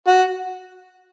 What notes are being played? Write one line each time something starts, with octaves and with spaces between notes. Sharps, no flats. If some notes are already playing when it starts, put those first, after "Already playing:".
F#4